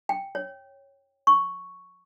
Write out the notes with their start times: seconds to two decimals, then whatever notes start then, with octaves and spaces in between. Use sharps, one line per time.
0.09 G5
0.35 C#5
1.27 C#6